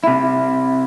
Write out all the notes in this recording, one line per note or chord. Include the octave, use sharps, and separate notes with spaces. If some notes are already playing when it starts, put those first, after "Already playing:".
C3 E4